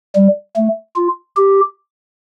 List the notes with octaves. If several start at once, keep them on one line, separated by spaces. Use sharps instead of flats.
G3
A3
F4
G4